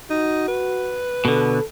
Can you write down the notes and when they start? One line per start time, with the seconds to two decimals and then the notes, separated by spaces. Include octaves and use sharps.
0.10 D#4 F#4
0.48 B4
1.25 B2 D3 A4